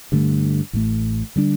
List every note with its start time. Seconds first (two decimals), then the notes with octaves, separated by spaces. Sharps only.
0.12 G2 D3 A3
0.73 A1 A2 A3
1.36 D3 G3 D4